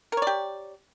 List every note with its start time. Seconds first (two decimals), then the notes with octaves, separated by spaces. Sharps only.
0.12 A#4
0.17 C#5
0.22 D5
0.27 G4